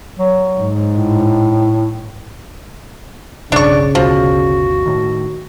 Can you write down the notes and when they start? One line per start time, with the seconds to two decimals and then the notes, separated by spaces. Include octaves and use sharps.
0.18 F#3
0.58 G#2
0.95 A2
3.52 F1 B1 G2 C#3 D4 D5 C#6
3.95 G1 D2 B2 F3 F#4
4.86 A2 D#3